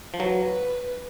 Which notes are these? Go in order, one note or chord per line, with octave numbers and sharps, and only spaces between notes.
F3
F#3 B4